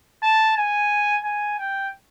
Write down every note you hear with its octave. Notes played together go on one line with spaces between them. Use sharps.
A5
G#5
G#5
G5